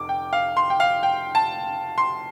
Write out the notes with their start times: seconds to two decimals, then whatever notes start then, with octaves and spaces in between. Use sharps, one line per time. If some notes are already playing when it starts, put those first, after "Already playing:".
Already playing: F1 D6
0.09 G5
0.33 F5
0.57 C6
0.70 G5
0.80 F5
1.03 G5
1.35 A5
1.98 C6